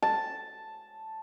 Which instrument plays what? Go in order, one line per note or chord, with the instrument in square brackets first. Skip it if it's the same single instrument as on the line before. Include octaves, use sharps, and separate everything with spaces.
[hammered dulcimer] A5